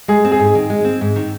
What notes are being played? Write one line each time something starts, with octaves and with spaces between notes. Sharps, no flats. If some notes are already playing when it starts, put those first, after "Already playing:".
G#3 G#4
C4
G#4
G#2
D#3
G#3
C4
G#2
D#3